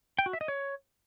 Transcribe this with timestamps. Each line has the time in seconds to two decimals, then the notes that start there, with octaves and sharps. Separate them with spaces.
0.19 G5
0.26 F#4
0.33 E5
0.41 D#5
0.48 C#5